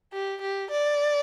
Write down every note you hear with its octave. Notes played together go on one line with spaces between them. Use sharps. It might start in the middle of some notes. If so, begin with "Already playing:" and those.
G4
G4
D5